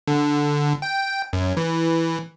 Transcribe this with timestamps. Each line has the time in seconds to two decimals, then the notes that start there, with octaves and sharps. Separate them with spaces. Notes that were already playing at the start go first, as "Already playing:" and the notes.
0.08 D3
0.82 G5
1.33 F#2
1.57 E3